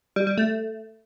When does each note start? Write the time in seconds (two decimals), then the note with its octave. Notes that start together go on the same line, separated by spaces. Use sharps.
0.16 G3
0.27 G3
0.38 A3